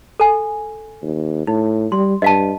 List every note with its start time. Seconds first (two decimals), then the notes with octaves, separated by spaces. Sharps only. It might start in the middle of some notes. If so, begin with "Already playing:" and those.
0.20 A4 G#5
1.03 D#2
1.47 A2 D#4
1.92 G3 C6
2.22 G2 D#5 F5 A5